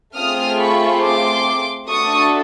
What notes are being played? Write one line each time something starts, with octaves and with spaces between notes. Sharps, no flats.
A3 C4 F4 G#4 D#6 F6
B5 C#6
C6 D6
A3 D4 F#4 A4 C#6 D#6